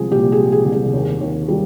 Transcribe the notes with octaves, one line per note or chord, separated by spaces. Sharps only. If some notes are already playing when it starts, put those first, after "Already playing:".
Already playing: C2 F3 G#3 G#4
A#2 G4
G#4
G#3
G#4
C2
G#4
D#2
D#2
G3